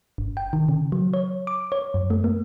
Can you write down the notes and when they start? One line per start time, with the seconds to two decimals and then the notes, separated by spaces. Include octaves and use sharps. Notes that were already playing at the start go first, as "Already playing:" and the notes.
0.18 G1
0.37 G5
0.53 D#3
0.68 C#3
0.92 F#3
1.14 C#5
1.47 D6
1.72 C#5
1.94 F#2
2.10 A3
2.24 A#3